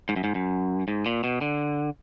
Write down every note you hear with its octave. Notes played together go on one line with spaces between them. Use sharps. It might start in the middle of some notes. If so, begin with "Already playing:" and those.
G#2
F#2
G#2
F#2
G#2
A#2
B2
D3